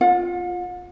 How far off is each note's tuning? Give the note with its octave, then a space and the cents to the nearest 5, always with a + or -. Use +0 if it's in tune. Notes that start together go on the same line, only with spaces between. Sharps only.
F4 +0 F#5 -45